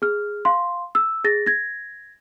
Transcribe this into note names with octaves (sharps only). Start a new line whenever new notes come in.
G#4 F6
F5 C6
E6
G#4 A6 A#6
G#6 A#6